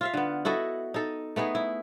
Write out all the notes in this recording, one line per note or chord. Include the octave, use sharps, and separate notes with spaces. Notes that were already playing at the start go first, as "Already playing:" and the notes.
F4 E5 F5
D3 B3
E4 F#4 A4 D#5
D#4 A4
A3 B3 D#4 G#4
E4